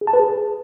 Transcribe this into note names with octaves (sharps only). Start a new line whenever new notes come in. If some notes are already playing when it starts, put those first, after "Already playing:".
G#4
A5
B4
G#4